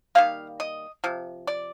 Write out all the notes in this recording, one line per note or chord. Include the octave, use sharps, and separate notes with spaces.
D#3 G3 A#3 F5
D#5
C3 F3
D5